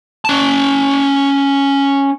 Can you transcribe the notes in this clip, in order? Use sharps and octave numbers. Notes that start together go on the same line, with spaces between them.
C#4 A5